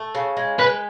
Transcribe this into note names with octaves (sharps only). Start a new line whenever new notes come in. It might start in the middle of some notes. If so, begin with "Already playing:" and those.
Already playing: A3
C#3
G#3
G#3 B4